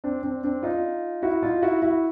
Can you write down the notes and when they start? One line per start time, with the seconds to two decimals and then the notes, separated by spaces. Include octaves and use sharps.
0.04 C4 D4
0.23 C4 D4
0.44 C4 D4
0.63 D#4 F4
1.22 E4 F#4
1.43 D#4 F4
1.62 E4 F#4
1.82 E4 F#4